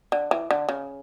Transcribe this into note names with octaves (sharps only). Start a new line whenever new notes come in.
D3
E3
D3
C#3